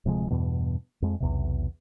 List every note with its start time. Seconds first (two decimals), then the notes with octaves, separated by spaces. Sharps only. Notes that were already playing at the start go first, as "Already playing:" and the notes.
0.05 D1 C3 F3 G#3
0.30 E2 G2 B2
1.02 F2 G#3
1.20 B1 E2 C3